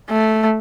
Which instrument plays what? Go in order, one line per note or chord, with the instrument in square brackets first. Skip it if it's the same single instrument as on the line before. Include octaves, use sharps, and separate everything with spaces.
[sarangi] A3